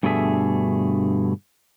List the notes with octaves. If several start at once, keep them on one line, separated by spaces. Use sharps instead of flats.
G2 B2 D3 A3 G#4 E5